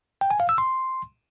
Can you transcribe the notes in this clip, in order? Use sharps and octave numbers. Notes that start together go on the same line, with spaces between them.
G5
G#5
F5
E6
C6